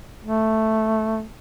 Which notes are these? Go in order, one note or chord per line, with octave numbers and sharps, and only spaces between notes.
A3